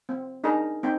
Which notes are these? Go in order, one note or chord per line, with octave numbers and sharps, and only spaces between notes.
C4
D4 D#4 G#4 A#4 D#5 A#5
C4 D#4 G5